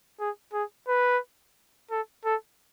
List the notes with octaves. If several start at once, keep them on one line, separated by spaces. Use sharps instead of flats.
G#4
G#4
B4
A4
A4